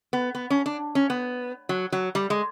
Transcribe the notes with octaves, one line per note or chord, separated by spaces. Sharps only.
B3
B3
C#4
D4
C#4
B3
F#3
F#3
G3
G#3